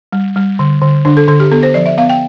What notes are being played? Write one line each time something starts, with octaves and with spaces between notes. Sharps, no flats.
G3
G3
D3
D3
D3 D4
A4
D3 A4
G4
B3 A4
C5
F3 D5
E5
B3 F5
G5